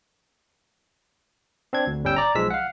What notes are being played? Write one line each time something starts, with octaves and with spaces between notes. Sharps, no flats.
C4 D4 G#6
D2
G1 G3 C#4 G5 E6
D5 A#5
B1 F3 G#3 E6 B6
F5 F#5